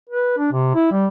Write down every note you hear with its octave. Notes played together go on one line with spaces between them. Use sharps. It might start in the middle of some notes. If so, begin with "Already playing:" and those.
B4
D4
C3
E4
G3